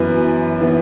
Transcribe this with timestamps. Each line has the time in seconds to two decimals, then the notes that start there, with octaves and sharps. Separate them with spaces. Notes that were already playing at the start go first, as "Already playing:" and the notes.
Already playing: F#2 E3 B3 B4
0.61 E3 B3